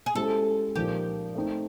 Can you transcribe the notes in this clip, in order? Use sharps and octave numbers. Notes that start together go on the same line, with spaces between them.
G#4
G#3 C#4 E4 G4 A4 C5
A#2 F3 A#3 D#4 G4
A3 C4 D#4